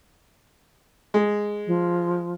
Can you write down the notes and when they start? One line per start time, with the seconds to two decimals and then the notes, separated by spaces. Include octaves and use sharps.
1.14 G#3
1.67 F3